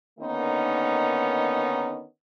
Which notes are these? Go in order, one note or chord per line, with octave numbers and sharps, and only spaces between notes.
D3 D#3 A#3 B3 C#4 D#4